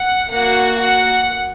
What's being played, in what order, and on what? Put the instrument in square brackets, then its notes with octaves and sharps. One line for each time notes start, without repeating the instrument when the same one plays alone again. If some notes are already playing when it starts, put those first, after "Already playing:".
Already playing: [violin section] F#5
A#3 F#4 F#5
F#5